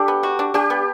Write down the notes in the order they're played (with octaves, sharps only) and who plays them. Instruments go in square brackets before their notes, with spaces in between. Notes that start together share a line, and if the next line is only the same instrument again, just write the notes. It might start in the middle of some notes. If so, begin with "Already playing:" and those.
Already playing: [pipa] D4 [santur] G4 A4
[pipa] B3
F#4
D4
[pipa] D4 [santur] G4
[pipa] B3